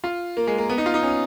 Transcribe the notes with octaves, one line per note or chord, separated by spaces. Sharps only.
F4
A#3
G#3
A#3
B3
D#4
F4
D#4
C#4